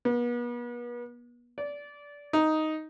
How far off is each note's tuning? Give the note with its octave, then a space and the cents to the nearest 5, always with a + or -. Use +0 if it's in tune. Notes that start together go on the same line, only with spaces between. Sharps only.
B3 -40
D5 -20
D#4 +5